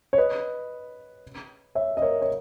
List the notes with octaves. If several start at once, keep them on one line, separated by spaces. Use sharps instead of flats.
C#5
B4 D#5
C#5 E5
D#5
A#4 C#5
C#5